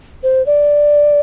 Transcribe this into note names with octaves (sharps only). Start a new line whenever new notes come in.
C5
D5